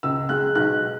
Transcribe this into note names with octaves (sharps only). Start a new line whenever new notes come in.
C#2 E6
G#3 F#6
B1 F#6